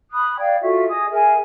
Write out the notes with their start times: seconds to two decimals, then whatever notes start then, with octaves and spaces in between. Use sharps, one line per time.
0.10 B5 D#6 F#6
0.38 D5 F5 G5 G#6
0.61 F4 F#4 A4 E5
0.88 G#4 D#5 D#6
1.10 G#4 A#4 E5 G#5